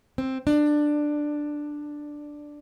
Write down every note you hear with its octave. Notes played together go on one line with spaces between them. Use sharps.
C4
D4